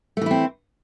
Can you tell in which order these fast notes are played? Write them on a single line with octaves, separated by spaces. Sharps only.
A3 E3 E4 C4